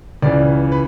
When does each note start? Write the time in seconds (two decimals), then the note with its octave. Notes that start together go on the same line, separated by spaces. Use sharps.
0.22 C#2 C#3 E3 D5
0.72 B4